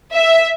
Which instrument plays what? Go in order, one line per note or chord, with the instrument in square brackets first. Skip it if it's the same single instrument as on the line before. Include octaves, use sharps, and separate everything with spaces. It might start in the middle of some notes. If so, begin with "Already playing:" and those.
[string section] E5